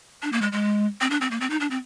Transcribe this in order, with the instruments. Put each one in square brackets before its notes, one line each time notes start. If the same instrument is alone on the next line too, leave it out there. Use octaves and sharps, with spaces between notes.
[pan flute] D4
A#3
G#3
G#3
C4
D4
C4
A#3
C4
D#4
D4
C4